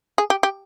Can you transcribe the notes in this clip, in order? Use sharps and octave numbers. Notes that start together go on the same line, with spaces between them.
G#4
G4
G4